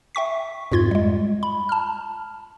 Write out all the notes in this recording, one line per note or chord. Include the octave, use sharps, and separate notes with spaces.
E5 G5 C#6 B6
F2 G#2 F4 C6 G#6
G3 G#3
B5
A5 F6